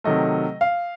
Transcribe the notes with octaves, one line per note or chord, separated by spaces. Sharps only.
C3 D#3 F#3 A3 D#5
F5